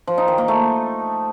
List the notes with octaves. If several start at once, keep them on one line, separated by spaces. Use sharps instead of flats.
F3
D#4
D#3
A#3
A3